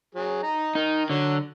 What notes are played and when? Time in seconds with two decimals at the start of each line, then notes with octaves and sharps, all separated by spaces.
0.15 F#3 G#4
0.43 D#4 A#5
0.75 D#3 D#4
1.10 D3 F#3